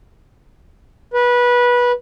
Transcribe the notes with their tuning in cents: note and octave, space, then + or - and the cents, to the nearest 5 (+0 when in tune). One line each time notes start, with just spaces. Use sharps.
B4 -20